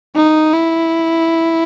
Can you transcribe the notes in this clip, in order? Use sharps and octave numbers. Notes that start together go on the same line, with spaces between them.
D#4
E4